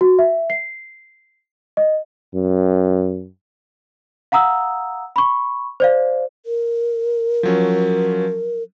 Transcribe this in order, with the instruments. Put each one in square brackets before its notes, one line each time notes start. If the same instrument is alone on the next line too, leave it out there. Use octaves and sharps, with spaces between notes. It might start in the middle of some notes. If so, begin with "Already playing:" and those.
[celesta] F#4
E5
C7
D#5
[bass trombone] F#2
[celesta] F5 F#5 A#5 D#6 E6
B5 C#6
C5 D5 F5
[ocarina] A#4
[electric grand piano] F3 F#3 C#4